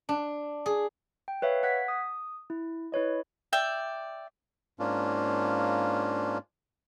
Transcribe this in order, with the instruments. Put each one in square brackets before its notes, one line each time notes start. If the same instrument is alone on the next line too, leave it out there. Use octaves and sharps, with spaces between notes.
[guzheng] D4
G#4
[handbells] G5
B4 C#5 E5 F5
F#5 F#6 G#6 B6
D#6
E4
E4 B4 C#5 D#5
[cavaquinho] D5 E5 G5
[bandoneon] G#2 A#3 C#4 D4 F4